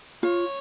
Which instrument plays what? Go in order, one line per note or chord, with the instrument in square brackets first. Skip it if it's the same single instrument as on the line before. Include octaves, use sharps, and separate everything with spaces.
[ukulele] F4 [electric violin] C#5